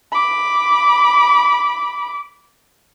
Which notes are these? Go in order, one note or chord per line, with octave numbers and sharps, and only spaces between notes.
B5 D6